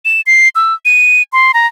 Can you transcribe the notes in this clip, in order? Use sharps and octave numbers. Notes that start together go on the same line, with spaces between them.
E7
C7
E6
D#7
C6
A#5